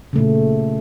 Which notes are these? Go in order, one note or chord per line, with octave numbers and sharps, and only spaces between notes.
A#2 C#3 A3